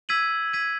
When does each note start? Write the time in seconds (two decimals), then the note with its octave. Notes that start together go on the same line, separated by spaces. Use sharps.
0.09 E6 G#6 B6 D#7 F#7
0.53 E6 G#6 B6 D#7 F#7